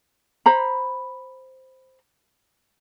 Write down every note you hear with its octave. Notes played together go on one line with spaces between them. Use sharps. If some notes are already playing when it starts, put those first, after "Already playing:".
C5 A#5 B5